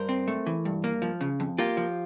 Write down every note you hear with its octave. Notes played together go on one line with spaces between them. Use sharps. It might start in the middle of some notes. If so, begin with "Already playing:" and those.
Already playing: G2 A#4 C5
C4
A3
E3
G2
A#3
F3
C#3
F2
A#3 F4 G4
F3